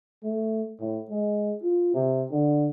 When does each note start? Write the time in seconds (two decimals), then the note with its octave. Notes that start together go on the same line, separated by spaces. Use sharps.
0.23 A3
0.79 A2
1.09 G#3
1.61 F4
1.94 C3
2.31 D3